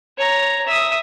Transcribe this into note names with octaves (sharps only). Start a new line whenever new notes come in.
C#5 A#5
E5 D#6